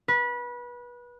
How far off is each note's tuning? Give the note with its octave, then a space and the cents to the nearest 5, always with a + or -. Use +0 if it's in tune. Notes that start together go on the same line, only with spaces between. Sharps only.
B4 -25